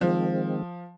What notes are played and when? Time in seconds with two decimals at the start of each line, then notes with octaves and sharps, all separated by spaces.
0.01 D#3 F3 G#3 C4